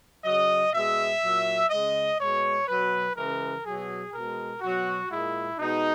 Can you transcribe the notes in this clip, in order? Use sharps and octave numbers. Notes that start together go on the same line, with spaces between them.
C#3 F#3 D#5
B2 G#3 E5
A#2 F#3
C#3 G#3 D#5
B2 G#3 C#5
B2 F#3 B4
C#3 E3 G#3 A#4
B2 F#3 G#4
B2 G#3 A#4
B2 F#3 F#4
A#2 G#3 E4
B2 G#3 D#4